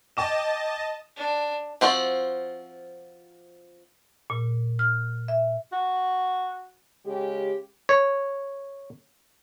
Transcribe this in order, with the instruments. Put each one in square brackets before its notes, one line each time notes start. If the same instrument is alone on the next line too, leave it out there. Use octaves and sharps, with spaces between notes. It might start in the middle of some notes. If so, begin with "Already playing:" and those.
[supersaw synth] D#5 A5 [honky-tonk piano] G5 D6 E7
[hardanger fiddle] D4
[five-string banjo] F3 C4 F4 F#4
[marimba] A#2
F6
E5
[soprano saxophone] F#4
[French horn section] C#3 G#3 G4
[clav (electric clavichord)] C#5